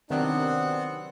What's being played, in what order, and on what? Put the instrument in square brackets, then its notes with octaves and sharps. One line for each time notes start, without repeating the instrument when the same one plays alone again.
[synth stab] C3 D#3 F#3 [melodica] B3 C4 F#5 [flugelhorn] D4